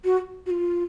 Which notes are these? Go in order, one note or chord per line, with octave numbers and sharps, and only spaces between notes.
F#4
F#4
F4